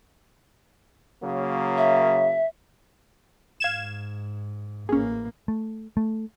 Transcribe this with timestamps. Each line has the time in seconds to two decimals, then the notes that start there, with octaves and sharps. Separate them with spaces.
1.23 C#3 F#3 A#3
1.77 E5
3.60 G#2 F5 G#6 E7
4.89 A1 A#3 C#4 G#4
5.48 A3
5.97 A3